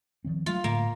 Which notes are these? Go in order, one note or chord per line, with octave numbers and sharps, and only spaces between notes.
D#3 F3 C4
F#3 G#3 A3 F4
A2 D3 A3 A#3